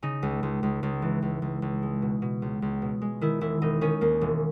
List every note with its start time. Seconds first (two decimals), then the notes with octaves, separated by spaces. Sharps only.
0.02 C#3 D#4
0.23 C#2
0.43 C#2
0.63 C#2
0.83 C#2
1.02 E3
1.22 C#2
1.42 C#2
1.62 C#2
1.83 G#3
2.02 B2
2.22 B2
2.42 C#2
2.62 C#2
2.82 B2
3.02 G#3
3.21 D#3 E4
3.41 E1 E4
3.62 E1 D#4
3.81 D#3 C#4
4.01 D#2 A#3
4.21 E1